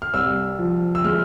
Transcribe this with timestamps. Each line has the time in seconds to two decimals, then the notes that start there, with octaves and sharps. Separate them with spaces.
0.02 F6
0.14 C2 E6
0.59 F3
0.95 E6
1.04 G#3 F6